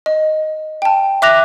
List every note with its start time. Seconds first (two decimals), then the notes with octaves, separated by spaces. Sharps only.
0.06 D#5
0.82 G5 A5
1.22 E5 D6 F#6 A#6 F7